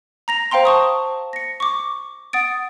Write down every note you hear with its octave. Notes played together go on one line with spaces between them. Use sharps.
A#5 A#6 F7
C5 F5 G5 A#5 C6
A5 C#6 D#6
A#6 C#7
C#6 D6
F#5 D#6 A6 D7